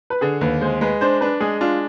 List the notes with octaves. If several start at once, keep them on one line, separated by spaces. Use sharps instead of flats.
B4
D3 G#4
D#2 B4
G#3 C5
G#3 B4
D4 C5
D4 B4
G#3 G#4
D4 F4